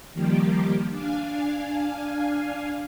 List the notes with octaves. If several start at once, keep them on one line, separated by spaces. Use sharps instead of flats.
D#3 F3 G3 A#3 G4
D4 F5 G#5